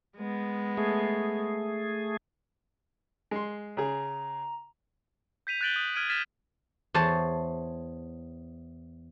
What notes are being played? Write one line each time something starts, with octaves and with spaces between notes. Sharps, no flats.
G#3 B3
A3 G#4
G#3 C6
C#3 G#4 A#5
G6 B6 D#7 F7
F#6 G6 A6 D7 F#7 G7
D#6
F6 G#6 D7 D#7
F6 G#6 A6 B6 E7
E2 C5 C#5 A5